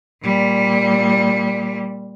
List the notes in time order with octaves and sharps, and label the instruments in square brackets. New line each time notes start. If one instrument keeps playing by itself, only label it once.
[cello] A#2 G3